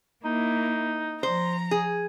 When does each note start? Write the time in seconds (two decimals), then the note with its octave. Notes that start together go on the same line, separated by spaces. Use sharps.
0.25 A#3 D#4 E4
1.23 F3 C5 A#5
1.71 G#4